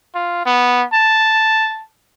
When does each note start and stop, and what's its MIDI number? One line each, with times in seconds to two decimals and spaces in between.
0.15 0.42 65
0.46 0.85 59
0.94 1.86 81